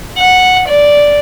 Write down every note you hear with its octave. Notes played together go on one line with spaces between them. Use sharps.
F#5
D5